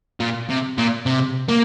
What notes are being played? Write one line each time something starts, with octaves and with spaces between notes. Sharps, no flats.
A#2
C3
A#2
C3
A#3